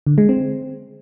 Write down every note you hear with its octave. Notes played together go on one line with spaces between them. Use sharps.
D3
G#3
C4